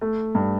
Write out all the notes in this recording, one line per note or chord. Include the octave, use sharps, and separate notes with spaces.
A3
G2